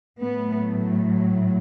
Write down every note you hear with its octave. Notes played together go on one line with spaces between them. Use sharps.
A2 F#3 A3 B3